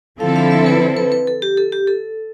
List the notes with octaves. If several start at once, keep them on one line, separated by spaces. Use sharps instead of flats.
D3 F3 C4 E4 A4 F5
F5
E5
B4
C5
B4
B4
A4
G4
A4
G4
A4